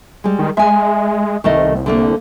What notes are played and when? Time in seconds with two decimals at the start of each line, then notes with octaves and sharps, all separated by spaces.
0.24 G3 G#3
0.39 D#3
0.57 G#3 E5 G#5
1.44 C2 D#3 A3 D#5
1.86 D3 A3 A#3